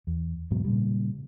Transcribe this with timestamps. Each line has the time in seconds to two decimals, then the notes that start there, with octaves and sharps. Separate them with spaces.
0.07 E2
0.51 E2 G#2 B2 F#3
0.64 A#2 C#3 G3